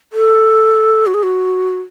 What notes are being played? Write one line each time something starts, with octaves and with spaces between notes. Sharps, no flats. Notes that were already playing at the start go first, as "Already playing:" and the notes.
A4
F#4
G#4
F#4